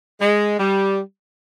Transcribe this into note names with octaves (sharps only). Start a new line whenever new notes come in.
G#3
G3